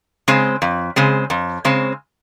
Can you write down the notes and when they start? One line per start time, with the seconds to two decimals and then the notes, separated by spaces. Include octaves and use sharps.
0.28 C#3 G#3 C4
0.62 F2
0.96 C#3 G#3 C4
1.30 F2
1.65 C#3 G#3 C4